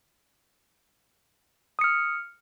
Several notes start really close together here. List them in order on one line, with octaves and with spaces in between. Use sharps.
D#6 C#7 F6